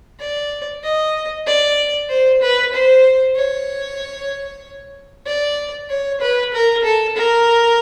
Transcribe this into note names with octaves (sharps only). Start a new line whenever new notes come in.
D5
D#5
D5
C5
B4
C5
C#5
D5
C#5
B4
A#4
A4
A#4